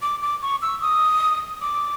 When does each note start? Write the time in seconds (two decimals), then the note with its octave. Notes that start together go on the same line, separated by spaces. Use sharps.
0.02 D6
0.22 D6
0.42 C#6
0.62 E6
0.82 D#6
1.61 D6